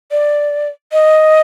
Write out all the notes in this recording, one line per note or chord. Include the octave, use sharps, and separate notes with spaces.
D5
D#5